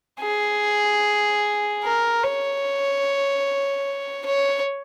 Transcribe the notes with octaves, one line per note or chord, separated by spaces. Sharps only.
G#4
A#4
C#5
C#5